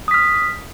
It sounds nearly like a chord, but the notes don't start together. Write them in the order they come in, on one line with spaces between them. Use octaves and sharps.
D#6 B6 F6